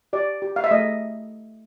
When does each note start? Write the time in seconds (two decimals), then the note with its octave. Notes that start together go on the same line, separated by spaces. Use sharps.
0.13 G4 D5
0.42 G4
0.56 F5
0.64 E5
0.71 A3 D#5